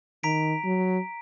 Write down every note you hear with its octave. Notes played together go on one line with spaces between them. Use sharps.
D#3 A#5 B6 D7
F#3